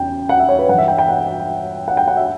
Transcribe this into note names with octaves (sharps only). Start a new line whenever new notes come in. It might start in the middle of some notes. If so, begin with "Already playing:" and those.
Already playing: E2 C#3 E3 G5
F#5
E5
C#5
B4
G2 E3 F#5
E5
G5
G5
F#5
F#5
G5
F#5
E5